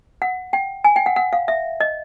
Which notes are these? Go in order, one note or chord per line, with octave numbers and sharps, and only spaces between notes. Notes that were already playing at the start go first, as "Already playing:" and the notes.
F#5
G5
G#5
G5
F#5
F#5
F5
E5
D#5